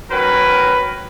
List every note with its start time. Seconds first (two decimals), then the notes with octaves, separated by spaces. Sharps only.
0.10 D#3 F#3 C#4 A#4 B4